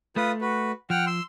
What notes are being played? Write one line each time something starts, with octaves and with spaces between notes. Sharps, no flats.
A3 F4 B4 D#6
F#4 B4
F3 F#5 G5 F6
C6 E6